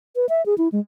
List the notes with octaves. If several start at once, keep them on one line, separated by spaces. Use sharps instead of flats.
B4
E5
G#4
E4
G#3